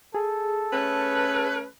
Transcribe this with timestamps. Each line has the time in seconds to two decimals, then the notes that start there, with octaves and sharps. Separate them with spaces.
0.14 G#4 A4
0.73 A3 C#4 B4